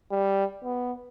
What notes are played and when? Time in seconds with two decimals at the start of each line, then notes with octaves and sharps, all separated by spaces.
0.11 G3
0.64 B3